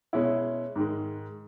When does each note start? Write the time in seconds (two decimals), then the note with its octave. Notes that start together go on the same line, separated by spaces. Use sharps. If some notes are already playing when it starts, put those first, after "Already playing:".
0.13 B2 G#3 C#4 E4
0.76 G#2 D#3 G#3